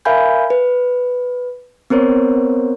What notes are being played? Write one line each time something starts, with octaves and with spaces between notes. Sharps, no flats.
A#4 E5 F5 G#5 B5 G6
B4
B3 C4 A#4 C5 C#5